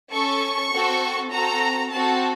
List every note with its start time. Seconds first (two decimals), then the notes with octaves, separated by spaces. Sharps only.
0.12 C#4 A4 C#6
0.72 C4 F#4 A4
1.32 C4 F#4 A4 A#5
1.92 C4 F#4 A4 A5